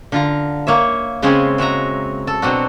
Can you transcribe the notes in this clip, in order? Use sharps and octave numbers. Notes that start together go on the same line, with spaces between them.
D3 F4 A#5
A#3 C#5 E5
C#3 G#3 C4 C#4 G#4
G#3 F#4 E5 A#5
A4
B2 F#3 C4 D4 F#4